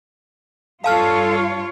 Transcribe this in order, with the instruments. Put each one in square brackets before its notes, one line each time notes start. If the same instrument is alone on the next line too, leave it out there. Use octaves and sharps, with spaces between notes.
[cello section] G2 F4 C#5 [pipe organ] A4 [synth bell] F5 A5 F6